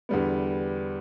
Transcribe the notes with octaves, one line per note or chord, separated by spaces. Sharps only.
E2 D3 G3 B3